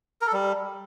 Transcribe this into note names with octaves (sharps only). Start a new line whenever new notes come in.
A#4
A4
G3